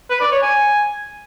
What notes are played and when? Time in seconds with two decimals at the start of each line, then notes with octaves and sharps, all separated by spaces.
0.10 B4
0.21 D5
0.32 C#5
0.42 G#5